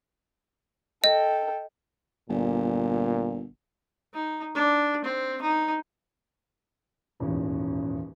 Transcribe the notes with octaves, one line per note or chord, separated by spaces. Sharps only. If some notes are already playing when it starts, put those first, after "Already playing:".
A4 D#5 G5
G1 A#2
D#4
D4
C4
D#4
D#1 G#1 E2 C#4